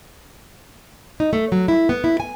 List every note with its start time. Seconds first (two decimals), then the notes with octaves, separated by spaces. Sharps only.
1.20 D#4
1.33 A3
1.52 F#3
1.68 E4
1.89 B3
2.04 E4
2.20 G#5